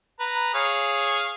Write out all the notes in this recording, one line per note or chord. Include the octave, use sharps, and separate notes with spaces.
B4 A#5
G#4 C#5 F5